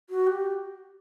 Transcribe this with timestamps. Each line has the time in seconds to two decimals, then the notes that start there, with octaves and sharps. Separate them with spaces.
0.10 F#4
0.27 G4